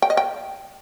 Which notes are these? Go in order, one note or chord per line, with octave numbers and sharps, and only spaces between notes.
G5
D#5
G5